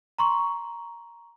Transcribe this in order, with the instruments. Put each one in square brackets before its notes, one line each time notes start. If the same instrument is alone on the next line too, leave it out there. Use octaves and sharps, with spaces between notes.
[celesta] A#5 C6 C#6